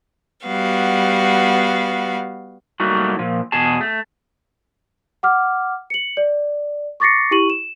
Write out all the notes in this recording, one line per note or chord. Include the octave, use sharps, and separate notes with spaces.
G3 B3 F#4 F5
F#3 G3 A3 A#3 D#4 F#4
A#2 F3
E2 B2 G#4 A5
A3
F#5 D6 F6
C#7 F#7
D5
C#6 D6 A6 A#6 C7 C#7
E4 G4 C#6 D#7 F#7
E7